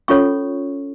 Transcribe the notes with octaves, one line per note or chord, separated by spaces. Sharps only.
C#4 F4 A4 C#5 C#6